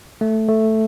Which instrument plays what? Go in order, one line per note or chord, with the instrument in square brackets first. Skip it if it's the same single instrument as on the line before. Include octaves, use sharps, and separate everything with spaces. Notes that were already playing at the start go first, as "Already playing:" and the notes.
[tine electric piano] A3
A3